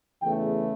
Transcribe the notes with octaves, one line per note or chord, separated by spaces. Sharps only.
E2 C#3 E3 A3 G5